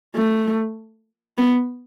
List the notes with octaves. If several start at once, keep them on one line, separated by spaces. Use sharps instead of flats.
A3
B3